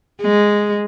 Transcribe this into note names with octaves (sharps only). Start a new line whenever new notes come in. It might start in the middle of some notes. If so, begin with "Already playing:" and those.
G#3